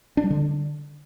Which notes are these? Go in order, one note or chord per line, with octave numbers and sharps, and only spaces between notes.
D4
G3
D3